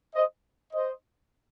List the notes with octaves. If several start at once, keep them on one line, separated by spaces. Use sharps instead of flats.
C5 D#5
C5 D#5